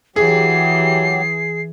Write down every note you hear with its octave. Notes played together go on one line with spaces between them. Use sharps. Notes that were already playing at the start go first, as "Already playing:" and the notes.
E3 F#3 G4 G#4 C7